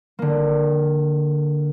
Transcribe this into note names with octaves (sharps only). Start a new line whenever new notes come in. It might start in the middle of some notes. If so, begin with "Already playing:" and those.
D3 A#3